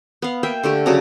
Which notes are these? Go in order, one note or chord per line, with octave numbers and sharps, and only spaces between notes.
B3 F5
A#3 E5 G5
D3 A3 G4
C#3 F#3 D4 A#5